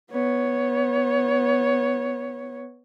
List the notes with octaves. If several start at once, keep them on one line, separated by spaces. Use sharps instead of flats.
B3 C#5